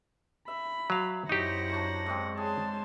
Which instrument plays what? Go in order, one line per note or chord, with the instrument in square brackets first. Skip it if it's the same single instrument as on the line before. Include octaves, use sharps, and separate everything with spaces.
[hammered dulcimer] E5 [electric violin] B5
[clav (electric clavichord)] F#3 F5
[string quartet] F#2 F#5 A#6 [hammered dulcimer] F#3 [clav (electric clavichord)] D#4 G4 [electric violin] E4 C5
[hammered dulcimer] D4 C#5 A#5
G#2 C4
[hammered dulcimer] G#4 [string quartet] C#5 [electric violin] A5 C6